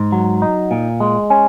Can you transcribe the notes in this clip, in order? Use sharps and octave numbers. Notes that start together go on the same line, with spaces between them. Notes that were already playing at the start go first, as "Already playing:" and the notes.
Already playing: G#2
F#3
D#4
A#2
G#3
C#4